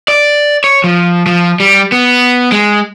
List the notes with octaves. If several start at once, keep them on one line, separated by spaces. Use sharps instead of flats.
D5
C#5
F3
F3
G3
B3
G#3